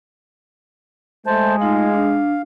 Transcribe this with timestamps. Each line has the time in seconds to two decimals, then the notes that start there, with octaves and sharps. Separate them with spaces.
1.27 G#3 A3 C5 A5
1.61 A3 D#4 F4 F5
1.94 D4